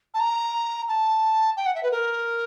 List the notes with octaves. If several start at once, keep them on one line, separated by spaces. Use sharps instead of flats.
A5
A#5
A5
G5
F#5
E5
B4
A#4